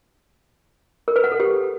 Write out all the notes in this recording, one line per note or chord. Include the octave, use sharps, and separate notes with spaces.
A#4
B4
F#5
A4
G4